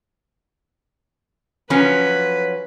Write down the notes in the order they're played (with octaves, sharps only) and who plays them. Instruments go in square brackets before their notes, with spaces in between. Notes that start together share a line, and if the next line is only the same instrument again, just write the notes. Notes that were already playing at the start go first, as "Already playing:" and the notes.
[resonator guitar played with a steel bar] F3 F#3 C#4 [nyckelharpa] B4